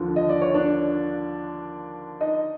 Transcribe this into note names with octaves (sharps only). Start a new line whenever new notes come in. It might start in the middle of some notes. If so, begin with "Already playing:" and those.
Already playing: D#2 D3 F3
D#5
D5
C#5
D4 D5
D#4 D#5